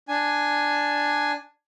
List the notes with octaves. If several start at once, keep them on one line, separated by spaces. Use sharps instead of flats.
D4 G#5